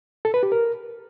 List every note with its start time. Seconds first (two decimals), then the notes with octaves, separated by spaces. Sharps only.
0.25 A4
0.34 B4
0.43 G4
0.52 A#4